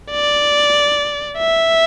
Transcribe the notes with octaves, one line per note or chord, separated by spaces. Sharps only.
D5
E5